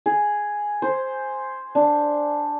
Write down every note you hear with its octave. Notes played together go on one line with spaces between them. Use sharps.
G#4
C5
D4